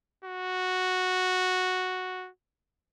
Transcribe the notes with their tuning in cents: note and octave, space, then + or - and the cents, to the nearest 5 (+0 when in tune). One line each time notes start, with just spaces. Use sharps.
F#4 -5